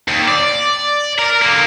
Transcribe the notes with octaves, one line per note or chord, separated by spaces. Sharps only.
D#2
D5
A#4
D3 A#3